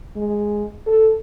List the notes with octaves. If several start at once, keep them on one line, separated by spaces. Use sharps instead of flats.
G#3
A4